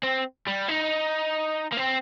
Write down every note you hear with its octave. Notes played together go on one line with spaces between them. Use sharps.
C4
G3
D#4
A#3
C4